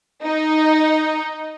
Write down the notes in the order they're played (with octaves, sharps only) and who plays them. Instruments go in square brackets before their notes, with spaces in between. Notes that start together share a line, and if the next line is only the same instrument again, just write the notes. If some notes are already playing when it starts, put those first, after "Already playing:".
[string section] D#4